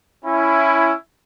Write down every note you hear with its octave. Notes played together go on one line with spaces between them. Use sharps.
C#4 E4